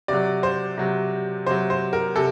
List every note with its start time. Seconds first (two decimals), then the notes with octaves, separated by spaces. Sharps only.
0.08 C3 F#3 D5
0.43 C5
0.77 C3 F#3
1.47 C3 F#3 C5
1.70 C5
1.93 A#4
2.16 C3 A4